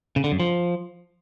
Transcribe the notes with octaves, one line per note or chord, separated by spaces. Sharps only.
C#3
D3
F#2
F3